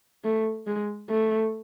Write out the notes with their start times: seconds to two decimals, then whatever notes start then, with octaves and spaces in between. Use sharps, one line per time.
0.24 A3
0.67 G#3
1.10 A3